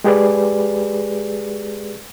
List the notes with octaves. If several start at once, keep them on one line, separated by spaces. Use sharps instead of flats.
G#3 G4 G#4 B4 D5